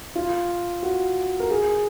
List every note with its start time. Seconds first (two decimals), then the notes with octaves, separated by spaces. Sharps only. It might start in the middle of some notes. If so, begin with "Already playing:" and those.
0.15 F4
0.83 F#4
1.40 A#4
1.50 G#4